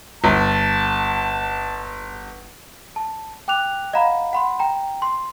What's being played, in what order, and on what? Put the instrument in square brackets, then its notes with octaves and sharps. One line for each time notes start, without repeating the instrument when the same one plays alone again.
[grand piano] G1 [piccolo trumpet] A5
[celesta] A5
G5 D6 F#6 F7
D#5 F5 F#5 A#5 B5
F#5 B5 C6
G5 A#5
C6